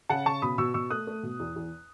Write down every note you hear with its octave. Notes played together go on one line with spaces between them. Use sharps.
C#3 F#5 A5
C#3 A5 C#6
B2 B5 D#6
B2 C#6 E6
B2 C#6 E6
A3 D#6 F#6
A3
B2
E2
E2